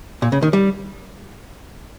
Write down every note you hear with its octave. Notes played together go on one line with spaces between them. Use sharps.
A#2
C#3
D#3
G3